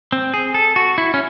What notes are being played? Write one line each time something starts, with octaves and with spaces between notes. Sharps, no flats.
C4
G#4
A4
F#4
E4
C#4